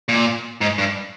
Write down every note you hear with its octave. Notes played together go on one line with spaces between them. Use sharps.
A#2
G#2
G2